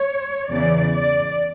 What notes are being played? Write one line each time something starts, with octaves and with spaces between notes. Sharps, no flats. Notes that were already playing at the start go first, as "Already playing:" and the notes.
Already playing: C#5
E2 C#3 E3 D5
D5